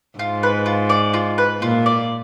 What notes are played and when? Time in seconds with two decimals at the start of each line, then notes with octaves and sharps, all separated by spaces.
0.19 G#2 F4
0.43 B4
0.66 F4
0.90 D5
1.14 F4
1.38 B4
1.61 A#2 F4
1.86 D5